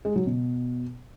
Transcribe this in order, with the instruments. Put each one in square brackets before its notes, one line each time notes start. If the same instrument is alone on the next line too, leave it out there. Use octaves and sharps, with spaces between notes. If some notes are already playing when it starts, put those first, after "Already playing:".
[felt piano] G#3
F#3
B2